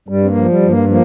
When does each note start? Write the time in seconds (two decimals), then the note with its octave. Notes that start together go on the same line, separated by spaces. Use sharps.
0.09 G2 G3
0.24 C4
0.29 A#3
0.35 F3
0.49 G3
0.62 G2
0.68 A#3
0.88 F3 A#3